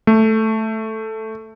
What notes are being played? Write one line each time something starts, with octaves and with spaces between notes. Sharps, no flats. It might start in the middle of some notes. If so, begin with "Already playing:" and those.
A3